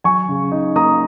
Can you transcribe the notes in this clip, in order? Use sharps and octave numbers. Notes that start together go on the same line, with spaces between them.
F#3 G#5 C#6
C#3
D#4
A#3 A#5 D#6